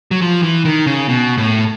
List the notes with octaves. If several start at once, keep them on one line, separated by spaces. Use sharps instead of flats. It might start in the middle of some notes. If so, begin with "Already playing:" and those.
F#3
F3
E3
D#3
C#3
B2
A2